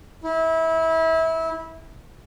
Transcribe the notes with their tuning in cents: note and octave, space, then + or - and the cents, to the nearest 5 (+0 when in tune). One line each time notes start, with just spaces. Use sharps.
E4 -25